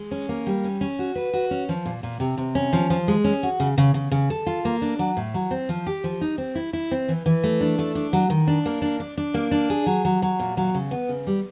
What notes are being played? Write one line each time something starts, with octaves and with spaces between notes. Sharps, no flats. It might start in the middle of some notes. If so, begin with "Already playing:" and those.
Already playing: G#3
C#4
A#3
G3
C#4
C#4
F#4
B4
F#4
C#4
F3
A#2
A#2
C3
C3
C#4
F3
F3
G#3
C#4
F#4
C#3
C#3
C#3
C#3
A4
F4
A#3
D4
F#3
A2
F#3
C4
F3
G4
F3
D#4
C4
E4
E4
C4
E3
E3
A3
D4
A3
D4
F#3
D#3
D4
A#3
D4
D4
D4
A#3
D4
G#4
F#3
F#3
F#3
A#2
F#3
C#3
B3
C#3
G3